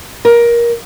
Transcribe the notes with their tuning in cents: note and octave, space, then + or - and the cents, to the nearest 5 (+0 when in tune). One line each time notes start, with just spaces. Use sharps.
A#4 +20